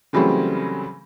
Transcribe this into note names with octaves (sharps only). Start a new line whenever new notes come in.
C#3 E3 F#3 G3 A3 C4